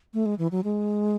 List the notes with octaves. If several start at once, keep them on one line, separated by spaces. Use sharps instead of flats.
A3
G#3
E3
F#3
G#3